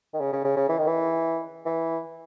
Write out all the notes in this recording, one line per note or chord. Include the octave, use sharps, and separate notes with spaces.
D#3
C#3
C#3
C#3
C#3
E3
D#3
E3
E3